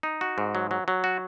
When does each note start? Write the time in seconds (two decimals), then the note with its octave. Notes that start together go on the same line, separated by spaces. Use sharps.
0.03 D#4
0.21 F#4
0.38 G#2
0.55 F#3
0.71 F#3
0.88 F#3
1.04 F#4